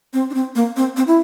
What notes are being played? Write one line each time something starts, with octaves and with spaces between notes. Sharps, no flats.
C4
D4
C4
A#3
C4
C4
E4